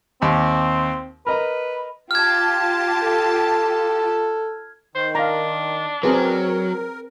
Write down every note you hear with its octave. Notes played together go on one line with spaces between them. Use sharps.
D#2 C4 G4 B5
A#4 B4 D#5 A#5
F4 G4 A5 F6 G#6
A4
D#3 C5
D4 F5 A#5
F#3 C4 G#4 A#4 B4